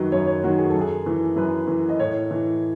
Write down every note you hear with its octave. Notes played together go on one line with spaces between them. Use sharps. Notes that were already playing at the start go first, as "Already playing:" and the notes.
Already playing: F#2 D#3 F#3 B4
F#2 C#5
C#5
D#3 F#3 F#4
G#4
F#2 A4
G#4
E3
F#2 B4
E3
D#5
A2 C#5
E3